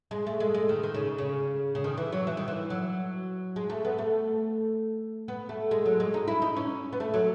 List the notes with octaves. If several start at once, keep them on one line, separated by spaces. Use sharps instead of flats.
G#3
A3
G#3
G#3
D#3
D#3
C#3
C#3
C#3
D#3
E3
F#3
E3
D#3
E3
F#3
G#3
A3
B3
A3
B3
A3
G#3
F#3
G#3
D#4
E4
D#4
C#4
B3
A3
F#3